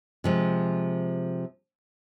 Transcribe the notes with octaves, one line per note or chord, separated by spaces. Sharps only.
C3 F3 G#3